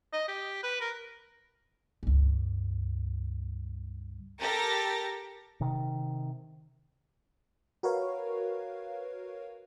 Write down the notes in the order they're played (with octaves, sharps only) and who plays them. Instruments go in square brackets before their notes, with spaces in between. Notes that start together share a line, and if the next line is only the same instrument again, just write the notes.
[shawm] D#5
G4
B4
A#4
[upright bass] C#2 G2
[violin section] G4 A4 A#4 A6 A#6
[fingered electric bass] C3 D#3
[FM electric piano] F#4 A#4 B4 C#5 F5